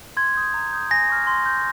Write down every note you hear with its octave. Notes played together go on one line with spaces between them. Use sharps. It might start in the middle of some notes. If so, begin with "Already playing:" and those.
C6 G#6
D#6 G6
A#5
D#6 G6
G#5 A#6
C#6 F6
C6
G6